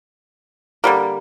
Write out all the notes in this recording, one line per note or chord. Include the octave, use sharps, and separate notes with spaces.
D3 G3 A#3